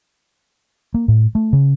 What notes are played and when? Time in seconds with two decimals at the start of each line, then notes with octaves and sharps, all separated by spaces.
0.94 A#3
1.08 A2
1.35 A3
1.53 C#3